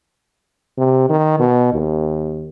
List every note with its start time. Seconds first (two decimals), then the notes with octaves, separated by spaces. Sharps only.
0.78 C3
1.09 D#3
1.39 B2
1.73 D#2